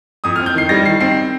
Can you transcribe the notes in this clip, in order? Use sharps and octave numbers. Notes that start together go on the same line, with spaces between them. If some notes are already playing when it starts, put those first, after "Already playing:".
F2 D#6
F6
C4
G6
D#3 C7
G3 A#6
D#3 C7
C4 C7